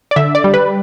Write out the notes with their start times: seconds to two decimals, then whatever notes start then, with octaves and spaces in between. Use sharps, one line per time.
0.11 D5
0.16 D3 E5
0.35 D5
0.44 G3
0.54 B4